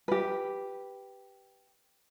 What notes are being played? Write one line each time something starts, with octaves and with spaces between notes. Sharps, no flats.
G4 B4